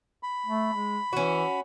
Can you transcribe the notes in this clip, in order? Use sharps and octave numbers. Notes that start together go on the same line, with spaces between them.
B5
A3
G#3
E3 C#4 F#4